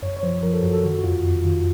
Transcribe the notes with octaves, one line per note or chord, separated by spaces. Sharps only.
F#2 C#5
C#5
F3 C5
F3 A#4
A4
F#2 F#4
A4
D#3 F#4
F#4
F2 F4
F2
D#3 F4